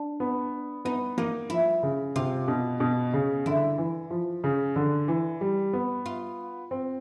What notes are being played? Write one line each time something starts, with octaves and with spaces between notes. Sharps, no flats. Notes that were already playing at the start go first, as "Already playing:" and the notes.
Already playing: D4
B3
B3 D#4
A#3 D#4
F3 E4
C#3
C3 F4
B2
B2
C#3
D3 E4
E3
F3
C#3
D3
E3
G3
B3
F4
C4